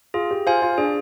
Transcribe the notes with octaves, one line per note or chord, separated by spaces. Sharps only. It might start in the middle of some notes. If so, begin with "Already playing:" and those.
F4 G#4
G4
F4 C5 F5 G#5
F4
D4 G#4